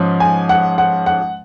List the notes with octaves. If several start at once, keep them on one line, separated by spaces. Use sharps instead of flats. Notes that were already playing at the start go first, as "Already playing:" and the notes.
Already playing: G#2 F3 C#4
G#5
F#5
F#5
F#5